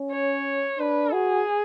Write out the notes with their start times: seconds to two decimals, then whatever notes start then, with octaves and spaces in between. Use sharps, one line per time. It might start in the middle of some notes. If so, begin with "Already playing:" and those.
Already playing: C#4
0.11 C#5
0.79 D4 B4
1.12 F#4 G#4